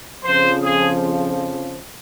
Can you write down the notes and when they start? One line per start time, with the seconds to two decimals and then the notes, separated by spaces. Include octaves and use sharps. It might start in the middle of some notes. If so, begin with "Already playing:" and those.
0.25 F2 C#3 F3 C5
0.63 G#4